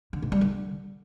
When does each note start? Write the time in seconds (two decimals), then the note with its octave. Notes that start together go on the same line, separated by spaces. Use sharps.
0.13 D3
0.22 G#2
0.32 G3
0.41 D3